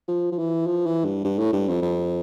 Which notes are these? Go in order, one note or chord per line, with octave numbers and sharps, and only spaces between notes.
F3
F3
E3
F3
E3
G2
G2
A2
G2
F2
F2